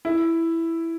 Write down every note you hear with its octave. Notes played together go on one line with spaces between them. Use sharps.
E4